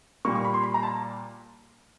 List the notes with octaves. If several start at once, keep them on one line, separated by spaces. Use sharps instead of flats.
A#2 G3 A#3 C#6
C#6
B5
C6
B5
A#5
A5